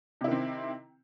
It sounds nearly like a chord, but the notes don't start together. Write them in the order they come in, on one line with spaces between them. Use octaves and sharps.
C3 E4 D#3 C4